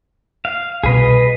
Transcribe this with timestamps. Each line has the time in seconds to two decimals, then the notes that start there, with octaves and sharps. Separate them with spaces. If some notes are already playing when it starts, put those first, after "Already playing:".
0.45 F5
0.84 C2 B2 G#4 B4 D#5